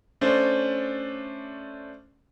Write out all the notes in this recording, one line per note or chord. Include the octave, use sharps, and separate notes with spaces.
A3 C#4 D4 C5